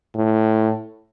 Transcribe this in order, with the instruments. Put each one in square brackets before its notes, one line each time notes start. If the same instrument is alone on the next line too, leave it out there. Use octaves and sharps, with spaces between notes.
[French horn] A2